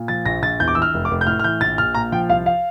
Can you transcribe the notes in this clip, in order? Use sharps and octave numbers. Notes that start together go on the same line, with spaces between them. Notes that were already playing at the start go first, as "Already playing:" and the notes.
Already playing: A#2
F3 A6
A#1 A#6
A#1 A6
E2 G6
D6
E3 E6
F6
F1
D6
F1
G6
A2 F6
F6
E3 G6
A#1 A6
A#1 F6
A#2 A#5
F3 G5
C2 F5
F5